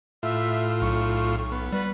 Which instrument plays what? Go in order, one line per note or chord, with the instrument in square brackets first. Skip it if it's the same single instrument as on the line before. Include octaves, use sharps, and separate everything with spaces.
[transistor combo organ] A2 F4 [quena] E5
[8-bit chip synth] B1 [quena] C#6
[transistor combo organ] B3
[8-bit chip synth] G3 [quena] B4